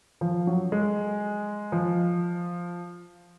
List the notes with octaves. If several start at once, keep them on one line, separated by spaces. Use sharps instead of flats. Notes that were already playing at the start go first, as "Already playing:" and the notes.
F3
F#3
G#3
F3